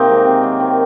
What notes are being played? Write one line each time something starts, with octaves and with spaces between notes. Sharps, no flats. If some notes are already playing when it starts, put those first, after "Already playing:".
Already playing: C3 D#3 A#3 C4 D#4
G#3
C3
F#3
D#3